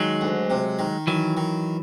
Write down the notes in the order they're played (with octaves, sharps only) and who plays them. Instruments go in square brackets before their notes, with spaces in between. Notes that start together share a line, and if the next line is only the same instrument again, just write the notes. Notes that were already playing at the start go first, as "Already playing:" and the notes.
Already playing: [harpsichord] D#3 [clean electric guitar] F#3 G#3
[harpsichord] D2
C3
D#3
[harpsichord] D#3 [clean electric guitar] E3 F#3
[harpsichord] D#3